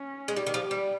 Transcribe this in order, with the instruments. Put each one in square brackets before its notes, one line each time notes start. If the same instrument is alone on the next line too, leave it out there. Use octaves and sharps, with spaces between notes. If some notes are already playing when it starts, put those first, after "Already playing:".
Already playing: [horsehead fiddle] C#4
[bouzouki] G#3
[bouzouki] G3 [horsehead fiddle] G4
[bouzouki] D#3
F3
G3